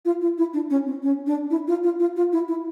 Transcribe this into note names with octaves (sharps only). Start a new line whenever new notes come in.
F4
F4
E4
D4
C#4
C4
C#4
D4
E4
F4
F4
F4
F4
E4
E4